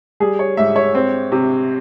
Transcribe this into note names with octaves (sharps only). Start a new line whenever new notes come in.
G3 G#4
C#5
G#2 E5
C#5
C4
C3